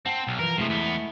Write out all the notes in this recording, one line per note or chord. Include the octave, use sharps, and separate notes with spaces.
C4 F#5 A5
B1
E3 F3 A#4
C3 F3 G#3 A3 E4
E2 B3